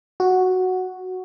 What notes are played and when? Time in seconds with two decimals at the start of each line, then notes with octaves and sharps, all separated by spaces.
0.20 F#4